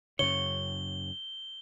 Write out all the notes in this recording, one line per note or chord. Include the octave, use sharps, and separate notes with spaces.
F#2 C#3 C#5 G7